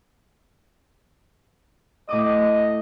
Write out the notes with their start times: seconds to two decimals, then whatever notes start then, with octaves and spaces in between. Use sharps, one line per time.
2.09 A2 D#5 D6 D#6